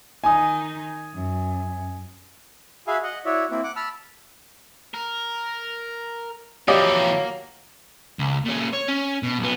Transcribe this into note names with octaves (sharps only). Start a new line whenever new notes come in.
D#3 D#4 G#5 D#6
F#2
F#4 G#4 E5 F5 G#5 B5
D#5 F#5
E4 F#4 C#5 D5 E5
A#3 C4 E4
F#5 D6
A5 B5 E6 F6
A#4
F2 E3 F#3 A#3 G4 D5 D#5 A#5
C#2
A#2 C#4
C#5
C#4
B2
B1 B3